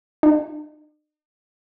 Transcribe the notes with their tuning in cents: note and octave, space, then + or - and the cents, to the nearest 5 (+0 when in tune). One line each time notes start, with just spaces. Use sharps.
D#4 -45